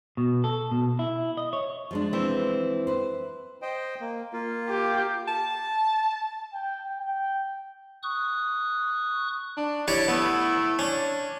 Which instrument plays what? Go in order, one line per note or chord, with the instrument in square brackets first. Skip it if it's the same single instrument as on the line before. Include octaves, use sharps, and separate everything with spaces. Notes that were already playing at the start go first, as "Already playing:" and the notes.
[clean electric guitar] B2
A4
B2
E4
D#5
C#5
[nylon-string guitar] F3 G#3 D4
[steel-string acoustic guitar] E3 C4 E4
[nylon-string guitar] B4 C5
[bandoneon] C5 D#5 G5
A#3
A#3 F4
[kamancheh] G4
[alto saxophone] A5
[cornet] G5
G5
[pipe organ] C#6 D#6 F#6
[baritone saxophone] D4
[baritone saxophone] E4 [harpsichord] G4 C#5 D5
[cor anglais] A3 [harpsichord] B3
[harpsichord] C#4 [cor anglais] D4